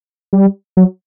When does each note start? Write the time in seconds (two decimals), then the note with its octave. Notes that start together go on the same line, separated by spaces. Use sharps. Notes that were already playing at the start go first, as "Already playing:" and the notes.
0.33 G3
0.77 F#3